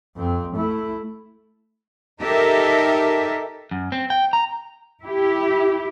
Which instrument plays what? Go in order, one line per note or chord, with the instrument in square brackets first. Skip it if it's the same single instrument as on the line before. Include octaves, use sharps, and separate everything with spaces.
[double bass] F2 C4
A3 E4
[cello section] D#4 G4 A4 A#4 E5
[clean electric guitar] F#2
C4
G5
A#5
[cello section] E4 G4